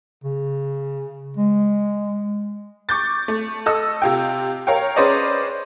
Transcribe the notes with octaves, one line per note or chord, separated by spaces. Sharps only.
C#3
G#3
C#6 D6 G6 A6
A3
A4 D#5 E6
C3 F4 G5
A#4 C#5 F5 G5
C#4 G#4 B4 C5 D5 D#5